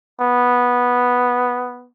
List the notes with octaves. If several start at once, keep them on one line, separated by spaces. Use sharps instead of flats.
B3